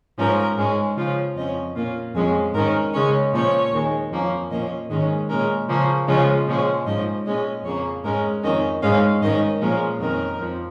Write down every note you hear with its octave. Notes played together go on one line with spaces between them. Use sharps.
G#2 F3 C#4 A#4
G#2 G#3 C#4
C#3 F3 C#4 F4
F2 F3 C#4 D#5
A#2 A#3 C#4 F4
F2 F3 G#3 C#4 G#4
G#2 D#3 C#4 A#4
C#3 G#3 C#4 C#5
A#2 F3 C#4 C#5
D#2 D#3 G#3
F2 F3 A#3 C#4
A#2 F3 A#3 C#4 D#5
G#2 D#3 G#3 C#4 D#5
A#2 G#3 C#4 A#4
C#3 F3 A#3 C#4
C#3 F3 G#3 C#4 F4
A#2 F3 G#3 C#4
G#2 F3 C#4 D#5
A#2 G#3 C#4 D#5
F2 C#3 A#3 C#5
G#2 G#3 C#4 A#4
F2 D#3 C#4 D#5
G#2 G#3 C#4 F5
G#2 D#3 C#4 D#5
A#2 F3 G#3 C#4 A#4
F2 D#3 C#4 A#4
F2 F3